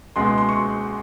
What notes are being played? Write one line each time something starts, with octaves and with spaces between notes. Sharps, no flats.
C#2 B2 G#3 C6
C6
C6
C#6